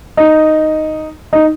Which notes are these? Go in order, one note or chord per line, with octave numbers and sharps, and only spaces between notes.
D#4
D#4